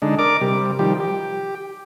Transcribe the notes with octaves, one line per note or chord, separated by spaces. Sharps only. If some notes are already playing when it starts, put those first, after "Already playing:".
D3 G#3 D4 D#4
A#4 D5 D6
C3 G3
D#3 F3 G3 G4
G4